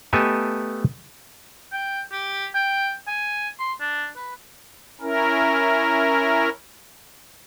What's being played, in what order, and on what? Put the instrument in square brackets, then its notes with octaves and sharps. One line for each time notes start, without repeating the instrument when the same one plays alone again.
[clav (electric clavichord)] A3 B3 G4 A4 D#5 G#5
[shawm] G5
G4
G5
G#5
C6
D4
B4
[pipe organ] C#4 E4 A#4